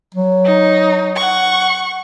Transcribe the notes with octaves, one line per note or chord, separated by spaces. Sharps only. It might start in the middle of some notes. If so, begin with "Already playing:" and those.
F#3
D#4
F#5 C#6